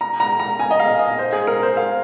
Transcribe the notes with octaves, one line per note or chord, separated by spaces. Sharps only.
A#5
A#5
A#5
G#5
D#5
F5
D#5
C5
G#4
A#4
C5
F5